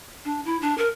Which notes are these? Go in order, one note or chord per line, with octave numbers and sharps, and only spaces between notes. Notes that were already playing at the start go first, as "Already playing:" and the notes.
D4
E4
D4
A#4